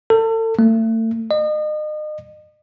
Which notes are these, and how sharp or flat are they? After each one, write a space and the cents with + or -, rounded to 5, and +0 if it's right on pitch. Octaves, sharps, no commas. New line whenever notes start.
A4 +35
A3 +35
D#5 -35